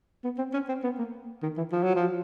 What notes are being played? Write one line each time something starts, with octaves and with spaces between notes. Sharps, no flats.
B3
C4
C#4
C4
B3
A#3
D#3
E3
F3
F#3
F3